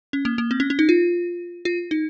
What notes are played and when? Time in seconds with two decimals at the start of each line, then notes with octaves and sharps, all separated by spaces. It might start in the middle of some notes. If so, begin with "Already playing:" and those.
0.13 C#4
0.25 A#3
0.38 A#3
0.51 C4
0.60 C#4
0.70 C#4
0.79 D#4
0.89 F4
1.65 F4
1.91 D#4